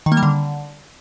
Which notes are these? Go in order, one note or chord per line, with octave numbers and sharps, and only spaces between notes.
D#3
A#3
G3
D3